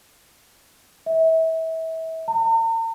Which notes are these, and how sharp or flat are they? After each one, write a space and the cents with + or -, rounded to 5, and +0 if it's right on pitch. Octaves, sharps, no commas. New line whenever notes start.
E5 -30
A#5 -45